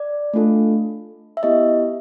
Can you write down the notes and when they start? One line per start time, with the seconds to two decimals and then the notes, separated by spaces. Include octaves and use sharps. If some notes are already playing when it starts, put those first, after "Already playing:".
Already playing: D5
0.34 A3 D4 F4 A4
1.37 E5
1.43 B3 E4 G4 D#5